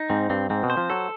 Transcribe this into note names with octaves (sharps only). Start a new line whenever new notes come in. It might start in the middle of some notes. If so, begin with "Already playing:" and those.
Already playing: D#4
G#2 C4
G2 C4
G#2 C4
B2
C5
F3
F#3 A4